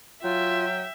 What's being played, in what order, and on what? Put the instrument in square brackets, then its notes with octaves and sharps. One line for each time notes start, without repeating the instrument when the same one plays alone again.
[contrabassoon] F#3 [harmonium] F4 [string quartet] E5 [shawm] G5